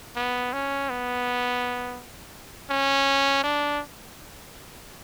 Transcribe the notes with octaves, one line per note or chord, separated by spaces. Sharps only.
B3
C#4
B3
C#4
D4